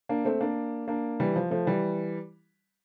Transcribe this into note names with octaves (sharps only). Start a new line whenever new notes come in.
A#3 D4
A3 C4
A#3 D4
A#3 D4
E3 G3
F3
F3 A3
E3 G3